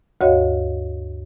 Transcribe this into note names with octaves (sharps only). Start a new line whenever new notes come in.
D2 G2 F#4 C#5 D#5 F5